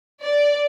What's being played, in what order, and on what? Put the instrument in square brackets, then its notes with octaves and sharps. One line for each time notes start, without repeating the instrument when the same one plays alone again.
[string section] D5